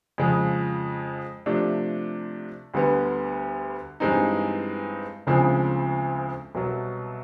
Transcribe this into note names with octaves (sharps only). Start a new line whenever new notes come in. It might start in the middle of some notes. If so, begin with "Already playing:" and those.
F2 C#3 F3 G#3
C3 F3 A3 D4
D2 D3 G3 B3
G2 E3 G#3 C4 D#4
D2 C#3 F3 G#3 C4
C2 B2 F#3